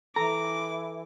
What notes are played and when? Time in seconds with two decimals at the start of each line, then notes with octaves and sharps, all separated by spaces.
0.16 E3 A4 A#5 D6